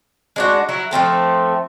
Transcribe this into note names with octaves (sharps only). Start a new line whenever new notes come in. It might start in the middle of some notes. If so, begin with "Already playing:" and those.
G#3 D4 F#4
F#3 E4 F#4
F3 A3 C4 A4